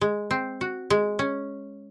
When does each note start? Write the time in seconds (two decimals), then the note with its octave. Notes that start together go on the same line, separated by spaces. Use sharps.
0.01 G#3
0.31 C4
0.61 F#4
0.90 G#3
1.19 C#4